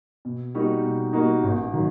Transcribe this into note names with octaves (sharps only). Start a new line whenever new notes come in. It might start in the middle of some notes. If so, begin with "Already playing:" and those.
B2
G3 A#3 D#4 F#4
B2
G3 A#3 D#4 F#4
A1
D#3 F#3